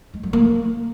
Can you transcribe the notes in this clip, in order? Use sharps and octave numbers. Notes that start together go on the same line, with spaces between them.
G#3
F#3
A#3